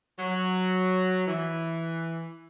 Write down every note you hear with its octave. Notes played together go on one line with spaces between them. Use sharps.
F#3
E3